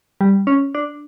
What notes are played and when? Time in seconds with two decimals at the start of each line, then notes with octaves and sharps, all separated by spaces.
0.21 G3
0.47 C#4
0.75 D4